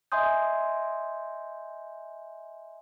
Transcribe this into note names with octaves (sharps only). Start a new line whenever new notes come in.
D#5 E5 G#5 C6 D#6 G6